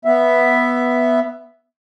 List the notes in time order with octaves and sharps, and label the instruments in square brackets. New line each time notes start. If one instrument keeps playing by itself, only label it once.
[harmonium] B3 E5